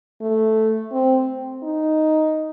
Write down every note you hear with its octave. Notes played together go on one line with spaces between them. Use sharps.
A3
C4
D#4